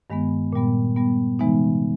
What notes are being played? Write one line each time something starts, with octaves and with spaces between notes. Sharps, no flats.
G2 D#3 G#3 B3
A#2 G3 B3
A#2 G3 B3
C3 E3 G#3 B3 D#4